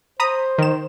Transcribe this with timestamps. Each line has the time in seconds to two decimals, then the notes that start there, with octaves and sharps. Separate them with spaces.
0.20 C5 A#5 B5 D#6
0.58 D#3 E7